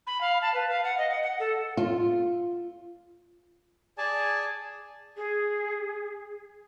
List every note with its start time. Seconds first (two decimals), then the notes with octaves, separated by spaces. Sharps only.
0.07 B5
0.21 F5
0.42 A5
0.54 B4
0.69 F5
0.84 F#5
0.98 D#5
1.10 F#5
1.23 F#5
1.40 A4
1.77 F4
3.98 G#4 D5 G#5 A5
5.16 G#4